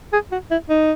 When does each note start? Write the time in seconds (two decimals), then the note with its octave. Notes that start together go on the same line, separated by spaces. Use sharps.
0.13 G#4
0.32 F#4
0.51 E4
0.69 D#4